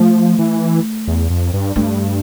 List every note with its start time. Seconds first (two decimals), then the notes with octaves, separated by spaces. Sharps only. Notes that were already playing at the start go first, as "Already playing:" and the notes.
Already playing: F3 A3
0.39 E3
1.07 E2
1.30 F2
1.54 G2
1.76 G2 A3